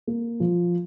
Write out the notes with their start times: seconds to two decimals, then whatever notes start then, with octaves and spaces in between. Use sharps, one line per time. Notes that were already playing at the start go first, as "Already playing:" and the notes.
0.07 A#3
0.40 F3